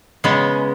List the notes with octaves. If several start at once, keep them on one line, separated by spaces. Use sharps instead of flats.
C#3 G#3 B3